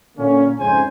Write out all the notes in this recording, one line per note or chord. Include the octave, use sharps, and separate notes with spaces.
A#2 D3 A#3 C#4
F2 G#2 C#3 C#4 C5 G#5